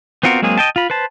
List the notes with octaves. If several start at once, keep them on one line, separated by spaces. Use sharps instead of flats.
B3 C4 F4 F#4 A#4
F#3 G#3 A#3 C4 G#4
D#5 G5 A5
F4 B5
B4 C5 A5